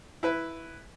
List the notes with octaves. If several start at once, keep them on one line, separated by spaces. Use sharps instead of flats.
E4 B4